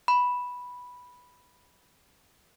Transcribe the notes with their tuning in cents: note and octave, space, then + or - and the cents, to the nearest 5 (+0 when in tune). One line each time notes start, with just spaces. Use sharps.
B5 -5